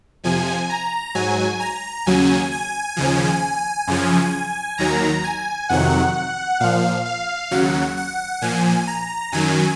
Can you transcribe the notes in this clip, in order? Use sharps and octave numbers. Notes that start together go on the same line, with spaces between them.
F2 C3 F3 G#5
A#5
G#2 F#3 G#5
A#5
D#2 C#3 F#3 G#5
G#5
D#2 C#3 F3
F#2 C#3 F3
D#2 D#3 F#3 A#5
G#5
F2 C3 D#3 F#3 F#5
A#2 F3 F5
F5
D#2 C#3 F#3 F#5
F#5
A#2 F3 G#5
A#5
F#2 D#3 F#3 G#5